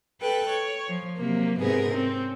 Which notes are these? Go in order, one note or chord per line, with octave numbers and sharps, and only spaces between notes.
A4 B4 G5 F#6
C#5
F3
C3 F#3 A#3
G#2 C3 B3 G#4 A#4
C4 C#4